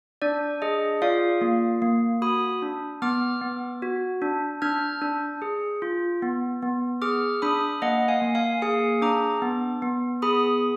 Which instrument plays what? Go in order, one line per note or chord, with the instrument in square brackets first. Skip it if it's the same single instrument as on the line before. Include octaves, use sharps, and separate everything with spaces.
[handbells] D4 D5
G#4 D#5
F4 D5 F5
A#3
A#3
F#4 B5 D#6
D4
B3 D6 F6
B3
F#4
D4
D4 F6 G#6
D4
G#4
F4
B3
B3
G#4 D6 F6
D4 B5 D#6
A#3 D#5 F#5
F5 G#5
A#3
F5 G#5
G#4 F5 G#5
D4 A#5 D6
B3
B3
G#4 B5 D#6